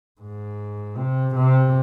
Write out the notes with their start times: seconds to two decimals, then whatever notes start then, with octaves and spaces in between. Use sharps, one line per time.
0.21 G#2
0.97 C3
1.35 C3